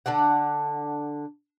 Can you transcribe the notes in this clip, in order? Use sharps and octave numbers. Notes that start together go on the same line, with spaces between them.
D3 D4 D5 F#5